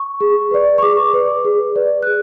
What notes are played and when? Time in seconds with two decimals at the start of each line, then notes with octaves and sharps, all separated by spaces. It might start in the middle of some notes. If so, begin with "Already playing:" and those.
Already playing: C#6
0.21 G#4
0.51 B4 D5
0.78 C#6
0.82 G#4 D6
1.13 B4 D5
1.45 G#4
1.75 B4 D5
2.03 F#6
2.07 G#4